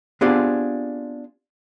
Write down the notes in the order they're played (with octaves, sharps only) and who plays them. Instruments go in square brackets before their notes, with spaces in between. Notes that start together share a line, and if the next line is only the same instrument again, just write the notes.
[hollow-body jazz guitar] B3 C4 D4 F4 G4 G#4